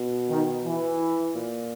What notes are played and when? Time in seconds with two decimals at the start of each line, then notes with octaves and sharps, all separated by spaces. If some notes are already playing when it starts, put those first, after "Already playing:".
Already playing: B2
0.29 D#3
0.64 E3
1.35 A#2